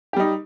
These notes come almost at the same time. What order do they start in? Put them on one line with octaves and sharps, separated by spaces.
G4 G3 D#4